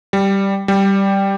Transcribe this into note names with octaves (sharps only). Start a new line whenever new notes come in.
G3
G3